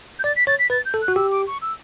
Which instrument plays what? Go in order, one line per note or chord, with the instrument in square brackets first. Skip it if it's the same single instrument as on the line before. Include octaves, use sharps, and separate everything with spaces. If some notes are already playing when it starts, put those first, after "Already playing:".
[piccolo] G6
[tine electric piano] D5 [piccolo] A6
[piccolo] B6
[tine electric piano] C#5 [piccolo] A6
[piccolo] B6
[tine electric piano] B4 [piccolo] A6
[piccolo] G6
[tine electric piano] A4
[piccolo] F#6
[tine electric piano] F#4
[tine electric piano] G4 [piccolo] E6
[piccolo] D6
C#6
E6